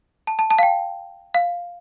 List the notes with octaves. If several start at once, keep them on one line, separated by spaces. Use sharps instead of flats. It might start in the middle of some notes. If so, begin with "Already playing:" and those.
A5
A5
A5
F5
G5
F5